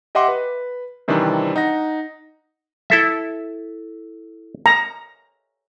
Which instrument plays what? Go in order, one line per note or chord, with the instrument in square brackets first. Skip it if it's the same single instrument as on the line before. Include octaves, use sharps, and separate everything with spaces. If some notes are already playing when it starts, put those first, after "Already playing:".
[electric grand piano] G4 D#5 E5 F#5 C6 D6
B4
C3 D#3 E3 G3 C4 D4
D#4 F#5 A#6
[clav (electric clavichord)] E4 A4 E5
[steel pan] A#5